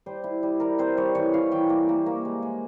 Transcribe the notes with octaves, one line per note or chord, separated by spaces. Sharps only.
G3 C5
E4
G3
G3 A#4
C4 C5
G3 C#5
E3 C#5
E3 F5
E3 G5
A#3
A#3
A#3
G#3
G#3